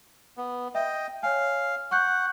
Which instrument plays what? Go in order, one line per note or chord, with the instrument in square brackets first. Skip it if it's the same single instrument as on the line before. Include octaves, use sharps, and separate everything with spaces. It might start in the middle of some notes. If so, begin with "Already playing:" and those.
[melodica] B3
[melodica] D#5 G5 [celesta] E5
[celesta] C#5 G#5 [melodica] F5
[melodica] F#5 [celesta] C#6 F#6 G6